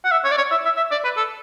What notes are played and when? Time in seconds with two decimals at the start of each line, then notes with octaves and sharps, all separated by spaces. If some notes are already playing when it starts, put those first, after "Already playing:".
0.05 F#5
0.12 E5
0.25 C#5
0.31 D5
0.38 C#5
0.51 E5
0.65 E5
0.77 E5
0.91 D5
1.04 B4
1.17 A4